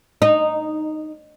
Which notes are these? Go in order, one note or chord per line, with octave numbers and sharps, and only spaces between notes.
D#4